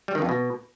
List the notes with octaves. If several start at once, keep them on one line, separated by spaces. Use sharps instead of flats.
G3
D#3
F2
B2